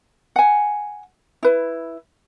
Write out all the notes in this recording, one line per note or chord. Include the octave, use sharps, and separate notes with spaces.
F#5 G#5
E4 B4